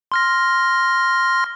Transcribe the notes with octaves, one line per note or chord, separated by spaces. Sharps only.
C6 F6 A#6